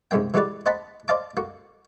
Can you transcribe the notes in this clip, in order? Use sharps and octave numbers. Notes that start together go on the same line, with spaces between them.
C2 G#2 G#3 A#3 G5
E3 G#3 F#4 G4 B4 D5
C5 D#5 F#5 A5 B5
C5 D5 D#5 F5 A5 D6
A#3 F#4